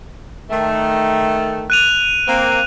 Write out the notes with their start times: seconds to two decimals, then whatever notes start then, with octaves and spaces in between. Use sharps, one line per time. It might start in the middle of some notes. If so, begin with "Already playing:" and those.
0.50 D#3 A3
1.70 F#6 D#7 F7
2.27 A#3 C4